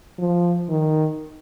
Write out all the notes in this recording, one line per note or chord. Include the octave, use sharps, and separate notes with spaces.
F3
D#3